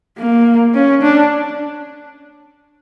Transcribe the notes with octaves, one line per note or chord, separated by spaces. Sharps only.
A#3
C#4
D4